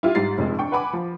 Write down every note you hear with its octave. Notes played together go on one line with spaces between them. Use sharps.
E4 F4 G4
G#2 G3 A6 C7
F1 F2 G#3
D4 G5 C#6
B4 F#5 G#5 B5 D6
F3